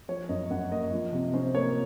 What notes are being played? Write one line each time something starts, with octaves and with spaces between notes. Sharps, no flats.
F3 C#5
F#2 D#5
F#2 F#5
A#3 D#5
F3
C3
C#4 C5
A#3 C#5